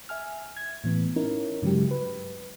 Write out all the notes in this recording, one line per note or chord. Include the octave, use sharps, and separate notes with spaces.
E5 G#5 F6
G#6
A2 E3 B3
C#4 D#4 E4 A#4
G2 C#3 F#3 G#3 G4
B4